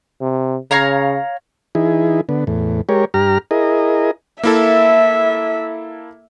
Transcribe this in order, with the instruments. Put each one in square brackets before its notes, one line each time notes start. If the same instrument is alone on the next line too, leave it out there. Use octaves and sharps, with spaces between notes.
[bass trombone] C3
[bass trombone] C#3 [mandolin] C#5 F5 A#5
[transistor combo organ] E3 D#4 E4 G#4
D3 B3
E2 A2
G#3 G4 A#4 C#5
G2 G4 A#5 F6
E4 G#4 A#4 D#5
[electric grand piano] A#3 E4 A4 [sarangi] E5